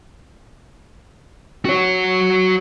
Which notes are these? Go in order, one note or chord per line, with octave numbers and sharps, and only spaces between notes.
F#4 C#5